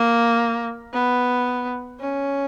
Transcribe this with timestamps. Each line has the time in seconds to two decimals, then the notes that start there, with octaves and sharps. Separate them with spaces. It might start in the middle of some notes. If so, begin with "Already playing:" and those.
Already playing: A#3
0.93 B3
2.00 C#4